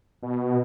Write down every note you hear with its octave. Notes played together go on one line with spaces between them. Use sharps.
B2